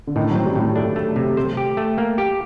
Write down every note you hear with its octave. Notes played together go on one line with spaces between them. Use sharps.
D3
A2 D#3
F#3
C4
G3
A2
G3
A3 D4
A3
C3
A3 C5
G4
A3
A#3
G4